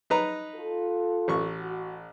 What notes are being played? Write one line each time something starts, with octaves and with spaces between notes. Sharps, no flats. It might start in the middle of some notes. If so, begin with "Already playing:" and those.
D#4 B4 A#5
F4 A4
A1 C#6
F#4